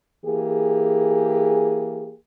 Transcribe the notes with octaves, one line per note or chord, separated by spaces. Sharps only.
E3 A#3 G4 G#4